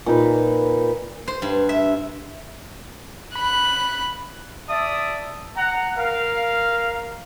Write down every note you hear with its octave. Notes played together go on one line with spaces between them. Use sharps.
A#2 D#4 B4
C5
G2
E5
B5 F#6
D5 E5 A5 D#6
F#5 A#5
A#4 F5